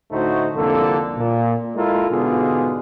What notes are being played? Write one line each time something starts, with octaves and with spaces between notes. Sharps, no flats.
D2 A2 A3 D#4 F#4 C5
C2 F2 D3 A#3 A4
A#2
G#3 E4 F4 A4 A#4
G#2 B2 D3 B3 F4 G#4